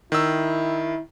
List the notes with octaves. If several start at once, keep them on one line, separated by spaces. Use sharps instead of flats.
D#3 E4 E6